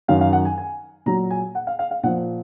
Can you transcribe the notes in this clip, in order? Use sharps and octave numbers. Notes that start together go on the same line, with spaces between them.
F#2 D#3 F#3 F5
F5
F#5
G#5
G#5
A#2 F#3 A#5
G#5
F#5
F5
F5
F5
A#2 F3 F#5